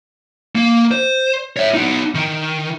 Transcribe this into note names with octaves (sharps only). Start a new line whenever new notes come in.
A#3
C5
C#5 E5
B3 D#4
D#3